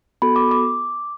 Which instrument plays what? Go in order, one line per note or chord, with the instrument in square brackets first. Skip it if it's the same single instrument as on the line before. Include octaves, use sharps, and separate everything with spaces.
[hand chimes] B3 F#4 A4 B5
D6
D6